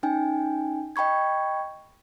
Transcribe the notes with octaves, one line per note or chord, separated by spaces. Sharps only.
C#4 D#4 G5 G#5
D#5 G5 B5 C#6 G#6